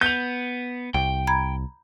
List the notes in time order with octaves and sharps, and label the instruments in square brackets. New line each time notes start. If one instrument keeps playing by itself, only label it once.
[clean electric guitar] B3 [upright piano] G6 F7
[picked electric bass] C2 [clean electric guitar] G5
[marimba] A#5 B5 G#6